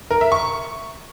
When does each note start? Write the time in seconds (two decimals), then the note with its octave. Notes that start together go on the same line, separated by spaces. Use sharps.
0.11 A#4
0.21 E5
0.32 C#6